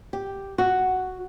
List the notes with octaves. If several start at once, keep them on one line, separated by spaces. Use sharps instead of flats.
G4
F#4